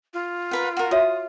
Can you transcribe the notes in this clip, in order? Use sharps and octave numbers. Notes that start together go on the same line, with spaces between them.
F4
A#4 B4 F#5
F#4 A#4
F#4 C#5 E5 D#6